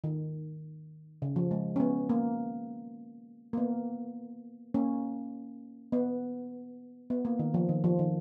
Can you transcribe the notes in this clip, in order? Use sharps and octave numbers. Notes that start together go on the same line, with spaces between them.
D#3
C#3
F3
G#3
C#4
B3
A#3
A#3
B3
A#3 C#4
B3
B3
A#3
D#3
F3
D#3
F3
D#3